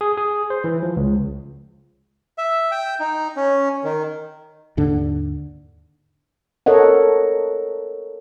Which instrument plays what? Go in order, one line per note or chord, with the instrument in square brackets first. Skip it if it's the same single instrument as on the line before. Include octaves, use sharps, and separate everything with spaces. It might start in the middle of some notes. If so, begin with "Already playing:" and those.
[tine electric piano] G#4
G#4
C5
E3
F3
C#2
[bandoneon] E5
G5
D#4
C#4
D#3
[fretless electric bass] D#2 G#2 D3 D4
[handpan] A4 A#4 C#5 D#5 F#5